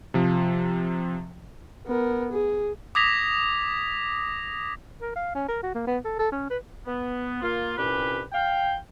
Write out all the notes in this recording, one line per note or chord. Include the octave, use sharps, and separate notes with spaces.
C3 F3
B3 A#4
G#4
D6 D#6 G#6 A#6 B6 F7
A#4
F5
C#4
A#4
F#4
A#3
B3
A4
A4
C#4
B4
B3
A#3 F4
C2 G2 A#2 C#4 G4 B4
F5 G5